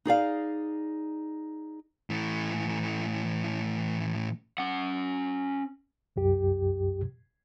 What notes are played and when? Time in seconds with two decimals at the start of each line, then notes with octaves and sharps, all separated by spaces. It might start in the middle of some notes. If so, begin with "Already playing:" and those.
0.05 D#4 G#4 D5 F5
2.10 A2 E3
4.58 C#4 F#5
6.16 C2 F#2 G4